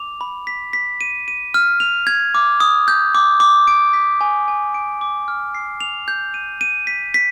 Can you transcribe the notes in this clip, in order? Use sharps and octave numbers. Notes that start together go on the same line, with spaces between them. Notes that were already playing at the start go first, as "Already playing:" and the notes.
Already playing: D6 F7
B5
B6
B6
D#7
D#7
F6
F7
G#6
D6
D#6
G6
D6
D6
D7
B6
G#5
G#5
D7
D6
F6
C7
F7
G6
D#7
D#7
B6
B6